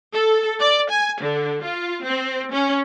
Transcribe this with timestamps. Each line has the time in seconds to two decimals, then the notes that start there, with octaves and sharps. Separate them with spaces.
0.13 A4
0.60 D5
0.90 G#5
1.20 D3
1.63 F4
2.04 C4
2.52 C#4